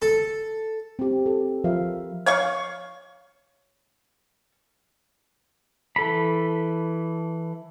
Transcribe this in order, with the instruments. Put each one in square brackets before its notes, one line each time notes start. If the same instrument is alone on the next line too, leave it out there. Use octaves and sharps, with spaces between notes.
[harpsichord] A4
[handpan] C4 G4
A4
F3 A#4 E5 F5
[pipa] C#5 F5 C#6
[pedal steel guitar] E3 A4 B5